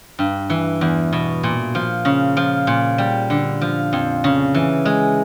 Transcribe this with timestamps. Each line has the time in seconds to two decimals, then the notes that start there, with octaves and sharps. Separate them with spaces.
0.19 G2
0.50 E3
0.81 E2
1.13 B2
1.43 A#2
1.75 F3
2.05 C#3
2.37 F3
2.67 A#2
2.98 G3
3.30 D3
3.61 F3
3.93 F2
4.24 C#3
4.54 E3
4.85 G#3